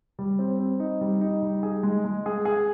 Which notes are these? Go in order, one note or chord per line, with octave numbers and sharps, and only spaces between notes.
G3
C4
C4
D#4
G3
D#4
G3
G#4
G#3
G#3
G#4
G#4